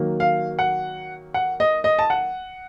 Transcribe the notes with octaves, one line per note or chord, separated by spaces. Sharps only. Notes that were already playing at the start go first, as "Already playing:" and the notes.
Already playing: D#3 F#3 A#3
F5
F#5
F#5
D#5
D#5
A5
F#5